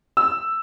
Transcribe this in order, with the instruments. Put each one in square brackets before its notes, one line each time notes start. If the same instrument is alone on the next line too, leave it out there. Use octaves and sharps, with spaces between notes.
[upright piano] E6